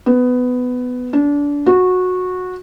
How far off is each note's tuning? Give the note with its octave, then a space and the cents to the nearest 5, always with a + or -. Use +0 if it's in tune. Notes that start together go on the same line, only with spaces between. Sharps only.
B3 +15
D4 -25
F#4 -15